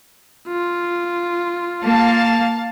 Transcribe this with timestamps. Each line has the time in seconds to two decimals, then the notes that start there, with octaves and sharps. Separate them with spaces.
0.48 F4
1.84 A#3 F5 A5